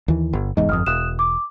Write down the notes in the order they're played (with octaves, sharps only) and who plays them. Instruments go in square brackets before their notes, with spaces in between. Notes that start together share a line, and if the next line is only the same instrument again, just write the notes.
[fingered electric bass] D#2 E3
G1
[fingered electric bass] F1 E2 G#2 [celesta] D#5
[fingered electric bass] G1 F2 [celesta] D#6 F6
[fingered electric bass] E1 [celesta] D#6 F#6 E7
[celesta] D6